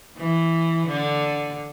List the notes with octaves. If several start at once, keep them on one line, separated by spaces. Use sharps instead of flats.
E3
D3